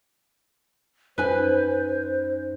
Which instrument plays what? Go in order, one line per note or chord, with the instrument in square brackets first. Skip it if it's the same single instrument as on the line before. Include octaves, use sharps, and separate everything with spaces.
[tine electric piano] F#2 C#4 D#4 [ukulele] B4 G#5 [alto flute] C5